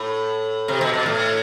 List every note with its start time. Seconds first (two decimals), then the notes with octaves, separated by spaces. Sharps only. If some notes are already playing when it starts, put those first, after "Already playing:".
Already playing: A2
0.68 C3
0.81 B2
0.94 B2
1.06 A2